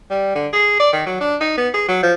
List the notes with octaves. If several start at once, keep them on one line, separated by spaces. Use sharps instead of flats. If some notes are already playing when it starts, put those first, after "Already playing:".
G3
D3
G#4
D5
D#3
F#3
D4
D#4
B3
G#4
F#3
F3